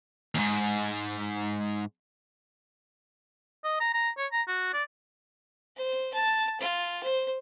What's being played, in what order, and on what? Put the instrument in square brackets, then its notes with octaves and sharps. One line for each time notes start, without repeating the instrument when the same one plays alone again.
[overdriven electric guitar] D#2 G#2
[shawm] D#5
A#5
A#5
C#5
A#5
F#4
D5
[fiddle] C5
A5
F4
C5